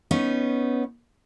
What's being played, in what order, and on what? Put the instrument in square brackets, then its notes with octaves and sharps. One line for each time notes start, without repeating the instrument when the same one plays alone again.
[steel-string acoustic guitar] B3 C#4 D#4